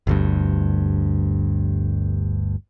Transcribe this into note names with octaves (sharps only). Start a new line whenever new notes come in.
G1 D2 G2